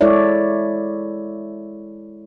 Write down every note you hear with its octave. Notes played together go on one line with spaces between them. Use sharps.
G#3 E4 A4 C#5 D5 E5